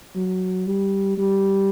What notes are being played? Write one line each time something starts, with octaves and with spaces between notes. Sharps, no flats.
F#3
G3
G3